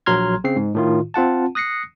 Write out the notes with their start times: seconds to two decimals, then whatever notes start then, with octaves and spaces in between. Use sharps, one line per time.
0.06 A#1 F#3 A#5 C6 F6 G#6
0.44 C#3 C4 C7
0.56 G#2
0.75 A2 D#3 F4
1.14 C4 F4 F#5 A5
1.55 D#6 F#6 A#6 C7 C#7